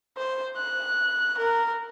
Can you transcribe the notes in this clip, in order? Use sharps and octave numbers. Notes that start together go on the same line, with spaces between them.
C5
F#6
A#4